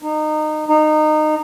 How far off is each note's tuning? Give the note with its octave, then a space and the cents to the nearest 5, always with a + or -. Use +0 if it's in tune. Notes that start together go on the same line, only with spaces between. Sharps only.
D#4 -25
D#4 -20